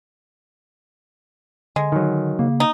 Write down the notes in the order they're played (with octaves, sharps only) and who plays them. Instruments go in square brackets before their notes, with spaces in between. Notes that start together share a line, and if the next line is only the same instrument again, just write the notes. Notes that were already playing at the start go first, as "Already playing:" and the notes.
[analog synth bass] D3 [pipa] G#3
[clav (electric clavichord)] D#3 F#3
[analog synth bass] C#3 [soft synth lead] A#3
[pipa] D#4